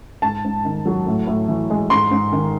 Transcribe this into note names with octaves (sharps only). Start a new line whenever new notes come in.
G#2 A5
G#2
D#3
F#3
A2
A2
E3
G#3
G#2 C6
G#2
D#3